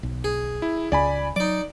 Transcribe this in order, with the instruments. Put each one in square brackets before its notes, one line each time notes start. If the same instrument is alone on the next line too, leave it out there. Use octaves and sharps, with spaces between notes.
[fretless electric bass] B1
[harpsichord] G#4
[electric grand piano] E4
[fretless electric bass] C#2 [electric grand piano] D5 G#5 B5
[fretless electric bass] F#3 [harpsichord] D#4 D6 [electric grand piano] D5